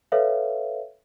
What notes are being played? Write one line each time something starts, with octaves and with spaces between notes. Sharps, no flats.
A4 B4 C#5 E5 F5